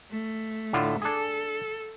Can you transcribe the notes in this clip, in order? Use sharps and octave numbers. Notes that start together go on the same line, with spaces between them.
A3
A2 D3 F4
D4 G#4 A4